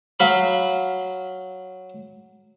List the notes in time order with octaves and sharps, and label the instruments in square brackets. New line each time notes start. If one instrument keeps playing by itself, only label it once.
[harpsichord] F#3 F5 B5